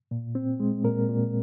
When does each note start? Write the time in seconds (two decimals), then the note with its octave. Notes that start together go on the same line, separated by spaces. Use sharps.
0.11 A#2
0.35 C4
0.60 G#3
0.84 A#2 A#4
1.09 A#2